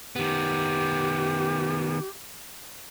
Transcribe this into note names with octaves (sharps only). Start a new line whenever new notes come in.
D#3 B3 G4